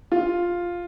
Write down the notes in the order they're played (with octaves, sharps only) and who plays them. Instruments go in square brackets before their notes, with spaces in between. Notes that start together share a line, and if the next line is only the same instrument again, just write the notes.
[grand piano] F4